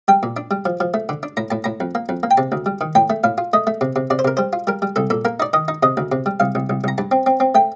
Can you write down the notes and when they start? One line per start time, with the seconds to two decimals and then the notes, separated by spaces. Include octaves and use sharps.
0.08 G3 G5
0.23 A#2
0.37 D4
0.51 G3
0.65 F3
0.80 F3
0.94 A3
1.09 D3
1.23 D4
1.37 A2 A#5
1.50 A2 A5
1.64 A2 A#5
1.80 F2
1.95 A#3
2.09 F2
2.23 A#3
2.31 G5
2.37 C3 A5
2.52 D2
2.66 G3
2.81 D#3
2.95 A2 G5
3.10 A3
3.24 A2 F5
3.38 F4
3.53 A3 D#5
3.67 A3
3.81 C3
3.96 C3
4.10 C3 D5
4.19 C5
4.25 C3 A#4
4.37 G3 C5
4.53 F4
4.67 G3 A#4
4.82 G3
4.96 C2 A4
5.10 A#2 A4
5.25 A#3 A#4
5.40 D#4 D5
5.53 D#3 D#5
5.68 D#4
5.83 C3 D#5
5.97 D2
6.12 C3
6.26 G3
6.40 C2 F5
6.55 C2
6.70 C2
6.84 C2 A#5
6.98 G2 A5
7.11 C4
7.26 C4
7.40 C4
7.55 A3 G5